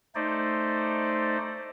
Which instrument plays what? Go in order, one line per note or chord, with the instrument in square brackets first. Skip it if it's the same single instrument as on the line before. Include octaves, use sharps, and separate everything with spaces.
[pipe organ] A3 D#4 C5 D5